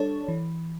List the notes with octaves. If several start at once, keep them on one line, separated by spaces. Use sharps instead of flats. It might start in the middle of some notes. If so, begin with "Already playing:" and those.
Already playing: G3 D4 A4 C#5
E3